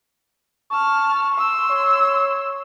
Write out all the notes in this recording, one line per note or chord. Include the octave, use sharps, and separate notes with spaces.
A5 C#6 F6
C6 E6
C#5